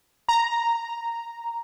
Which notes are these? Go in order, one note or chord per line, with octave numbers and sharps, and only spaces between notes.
A#5